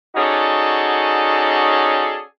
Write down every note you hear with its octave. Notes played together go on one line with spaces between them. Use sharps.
C#4 D#4 F#4 G#4 A4 D5